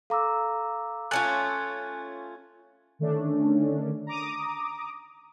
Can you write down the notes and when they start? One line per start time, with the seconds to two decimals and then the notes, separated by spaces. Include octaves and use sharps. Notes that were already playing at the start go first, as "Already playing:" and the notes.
0.10 A4 F5 A#5 D6 E6
1.11 A3 C#4 F4 G#5 A5 F#6
2.99 D3 D#3 A3 C#4 D4
4.07 A#5 D6 D#6